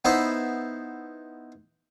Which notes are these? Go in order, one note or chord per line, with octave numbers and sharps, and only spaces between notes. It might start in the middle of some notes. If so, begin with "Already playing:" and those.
B3 D#4 E4 C5 E5